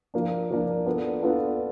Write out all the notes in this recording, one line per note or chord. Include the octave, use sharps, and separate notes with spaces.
F3 A#3 D4
F3 A#3 D4
B3 D4 F4 A4
B3 D4 F4 A4